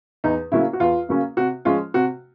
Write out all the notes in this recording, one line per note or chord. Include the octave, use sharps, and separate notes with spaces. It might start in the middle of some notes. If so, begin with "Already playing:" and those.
E2 D#4
C#3 F#3 A#3 C#4 E4
F#4
E2 F4
C#3 F#3 A#3 C#4
C3 F#4
F3 G#3 C#4 F4
C3 F#4